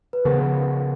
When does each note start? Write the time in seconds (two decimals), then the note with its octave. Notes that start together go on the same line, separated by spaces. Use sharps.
0.13 B4
0.24 C#3 F3 B3 A#4